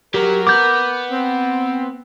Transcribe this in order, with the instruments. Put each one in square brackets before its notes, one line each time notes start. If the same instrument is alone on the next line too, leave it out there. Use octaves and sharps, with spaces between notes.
[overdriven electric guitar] F#3 [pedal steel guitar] G4 [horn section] A#4
[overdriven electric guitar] B3 [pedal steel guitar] D6 G6
[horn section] C4